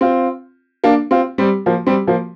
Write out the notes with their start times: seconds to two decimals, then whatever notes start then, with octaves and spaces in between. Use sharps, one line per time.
0.01 C4 F4
0.84 A#3 D4
1.11 C4 F4
1.38 G3 C4
1.66 F3 A#3
1.87 G3 C4
2.07 F3 A#3